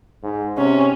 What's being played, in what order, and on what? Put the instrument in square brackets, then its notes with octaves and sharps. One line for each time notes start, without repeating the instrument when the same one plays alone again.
[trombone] G#2
[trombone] C3 [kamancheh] C#4